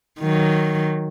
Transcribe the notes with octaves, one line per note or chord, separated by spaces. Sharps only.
D#3 F#3